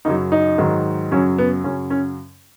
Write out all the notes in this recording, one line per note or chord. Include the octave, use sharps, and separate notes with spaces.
F#2 C#3 F#3 D#4
D#4
G#2 D#3 F#3
F#2 C#3 F#3 C#4
B3
F#2 C#3 F#3 C#4
C#4